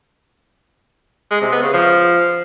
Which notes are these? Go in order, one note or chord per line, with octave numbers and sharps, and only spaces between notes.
G#3
C3
B3
C#3
F3